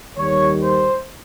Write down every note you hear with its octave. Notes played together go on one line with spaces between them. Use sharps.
D#2 D#3 G3 C#5
C5